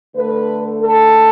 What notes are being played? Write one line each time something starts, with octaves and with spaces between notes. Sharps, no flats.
D3 A3 B4
A4